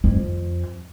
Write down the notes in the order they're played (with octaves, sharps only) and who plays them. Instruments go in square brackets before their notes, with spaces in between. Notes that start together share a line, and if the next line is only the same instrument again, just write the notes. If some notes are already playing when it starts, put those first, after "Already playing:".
[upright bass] F2